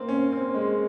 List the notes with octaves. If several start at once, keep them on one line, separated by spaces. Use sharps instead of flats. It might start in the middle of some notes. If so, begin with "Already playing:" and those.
Already playing: A#3 C4
C#4
C4
G#3